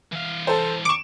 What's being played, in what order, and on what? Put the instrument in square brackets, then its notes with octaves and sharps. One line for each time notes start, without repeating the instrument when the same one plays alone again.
[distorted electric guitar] E3 F5
[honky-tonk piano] A4 C5
[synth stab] C#6 D6 [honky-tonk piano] D7 E7